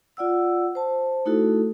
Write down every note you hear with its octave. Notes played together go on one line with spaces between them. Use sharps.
F4 D5 F#5 E6
C5 A5
A3 D#4 E4 F#4 A4